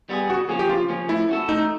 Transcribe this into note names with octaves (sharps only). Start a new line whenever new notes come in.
G3 B3 E4 G#4
C#3 F#4
F3 A#3 C#4 G#4
G4
C#3 F4
F3 A#3 C#4
A3 E4
C#4 F#4 A4
A3 D#4